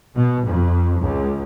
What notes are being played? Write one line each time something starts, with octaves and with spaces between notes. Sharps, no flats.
B2
F2
C#2